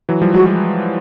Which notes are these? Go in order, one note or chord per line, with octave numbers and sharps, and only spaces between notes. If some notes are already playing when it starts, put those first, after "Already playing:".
E3 F#3
F3 G3
F#3 G#3 F#4